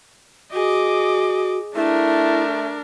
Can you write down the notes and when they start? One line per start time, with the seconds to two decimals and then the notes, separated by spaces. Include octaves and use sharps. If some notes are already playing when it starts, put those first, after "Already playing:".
0.53 F#4 G#4 D#5 D6
1.75 A3 D4 E4 A#4